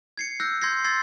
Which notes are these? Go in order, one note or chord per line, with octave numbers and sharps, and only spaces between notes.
G#6 C7 C#7
E6 F#6 G6 A#6
C6 G6 G#6 A#6 C7
C6 E6 G#6 A6 C7